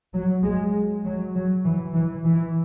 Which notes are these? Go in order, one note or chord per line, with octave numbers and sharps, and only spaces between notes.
F#3
G#3
F#3
F#3
E3
E3
E3